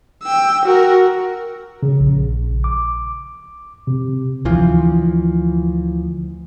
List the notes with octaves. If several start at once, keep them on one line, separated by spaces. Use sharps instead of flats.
G5 E6
F#4 A#4
C#3
A#1
D6
C3
D2 E3 F3